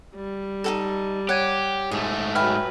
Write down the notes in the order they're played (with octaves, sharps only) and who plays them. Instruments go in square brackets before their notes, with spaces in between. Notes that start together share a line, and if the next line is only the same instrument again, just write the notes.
[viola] G3
[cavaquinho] D#4 F#4 A4
[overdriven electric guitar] G4 [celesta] C#5 G#6 D#7 [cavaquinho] F#5
[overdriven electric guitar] G#2 A3 [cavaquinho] G#4
[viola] F#3 B4 [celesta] E5 B5 F6 [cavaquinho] G5 G#5